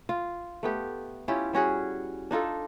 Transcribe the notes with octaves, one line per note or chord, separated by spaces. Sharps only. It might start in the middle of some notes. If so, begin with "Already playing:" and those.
F4
A3 B3 G4
C#4 E4 F4 G4
G3 C#4 F#4 G#4
D4 D#4 F4 A4